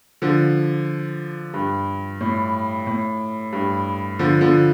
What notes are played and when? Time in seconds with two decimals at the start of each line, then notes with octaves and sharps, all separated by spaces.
0.22 D3 F3
1.54 G2
2.21 A2
2.87 A2
3.53 G2
4.19 D3 F3
4.41 D3 F3